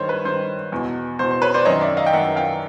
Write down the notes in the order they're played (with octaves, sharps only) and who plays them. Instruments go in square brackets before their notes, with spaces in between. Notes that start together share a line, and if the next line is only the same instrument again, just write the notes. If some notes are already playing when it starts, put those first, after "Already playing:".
Already playing: [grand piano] G2 D#3 C5 C#5
B4
G2 D#3 C5
E2 B2
E2 B2 C5
C5
B4 C#5
C5 D5
F#2 D#3 C#5 D#5
D5 E5
D#5 F5
G5
D#3 E5 F#5
F#2
F5 G5